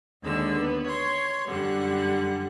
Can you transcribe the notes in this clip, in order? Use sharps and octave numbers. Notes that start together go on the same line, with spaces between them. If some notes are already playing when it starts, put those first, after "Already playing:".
D#2 D3 G#3 E6
B3
C#5 C6
F#2 D3 G3 F#5